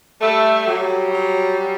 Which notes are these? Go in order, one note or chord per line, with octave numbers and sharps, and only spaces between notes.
G3 A3
F#3 G3
F#3
F#3